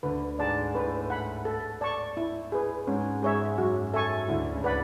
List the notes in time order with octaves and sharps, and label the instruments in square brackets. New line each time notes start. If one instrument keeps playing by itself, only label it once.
[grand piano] D2 D3 [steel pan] B4
[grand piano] G#2 G#3 [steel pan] D5 A5
[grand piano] A2 A3 [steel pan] B4
[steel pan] F#5 B5
A4
D5 A5 C#6
E4
G#4 B4
[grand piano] G#2 G#3 [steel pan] C#4
[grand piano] G#2 G#3 [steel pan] G#4 C#5 E5
[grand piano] F#2 F#3 [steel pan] F#4
[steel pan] A4 E5 G#5 C#6
[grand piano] D2 D3 [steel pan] E4
[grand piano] C#2 C#3
[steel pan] B4 D5 F#5 B5